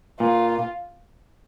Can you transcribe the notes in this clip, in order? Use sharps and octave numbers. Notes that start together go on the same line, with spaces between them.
A#2 F4